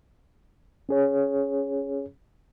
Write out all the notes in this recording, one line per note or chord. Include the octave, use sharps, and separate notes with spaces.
C#4 G#4 C#5